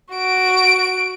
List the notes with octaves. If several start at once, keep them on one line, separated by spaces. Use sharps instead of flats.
F#4 D7